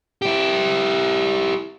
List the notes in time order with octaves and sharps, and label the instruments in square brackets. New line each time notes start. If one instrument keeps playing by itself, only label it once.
[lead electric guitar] E4 G4